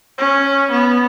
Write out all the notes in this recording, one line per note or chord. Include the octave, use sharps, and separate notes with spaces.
C#4
B3